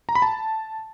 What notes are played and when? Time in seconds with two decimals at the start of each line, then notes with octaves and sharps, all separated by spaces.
0.09 A#5
0.15 B5
0.22 A5